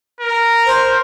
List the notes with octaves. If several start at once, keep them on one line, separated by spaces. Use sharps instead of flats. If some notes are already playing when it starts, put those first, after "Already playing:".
A#4
C5